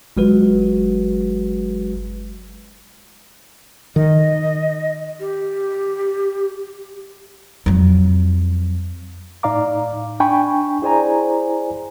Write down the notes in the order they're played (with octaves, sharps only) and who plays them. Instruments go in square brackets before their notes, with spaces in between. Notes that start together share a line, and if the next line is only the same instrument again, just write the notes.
[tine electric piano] G1 F#3 G#3 F#4 B4
[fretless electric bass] D#3 [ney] D#5
[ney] G4
[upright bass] F2 F#3
[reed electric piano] A2 D#4 D5 F5 A#5 D6
D4 G5 G#5 B5 C#6
E4 G#4 C5 D5 G#5 A#5